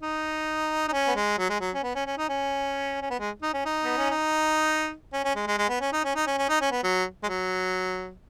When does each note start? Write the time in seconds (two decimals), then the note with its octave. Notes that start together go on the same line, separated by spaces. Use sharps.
0.02 D#4
0.88 D#4
0.92 C#4
1.07 B3
1.16 G#3
1.38 F#3
1.49 G#3
1.61 F#3
1.74 C#4
1.84 B3
1.95 C#4
2.06 C#4
2.18 D#4
2.29 C#4
3.01 C#4
3.10 B3
3.20 G#3
3.42 D#4
3.54 C#4
3.65 D#4
3.84 B3
3.97 C#4
4.11 D#4
5.13 C#4
5.24 C#4
5.36 G#3
5.47 G#3
5.58 G#3
5.69 B3
5.81 C#4
5.93 D#4
6.04 C#4
6.15 D#4
6.27 C#4
6.38 C#4
6.49 D#4
6.61 C#4
6.72 B3
6.83 F#3
7.23 G#3
7.28 F#3